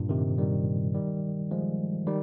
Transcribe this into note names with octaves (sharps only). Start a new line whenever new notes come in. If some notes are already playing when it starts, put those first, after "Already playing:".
Already playing: G2 A#2
C3 D#3
D#3 G3
D#3 G3
F3 G#3
D#3 G3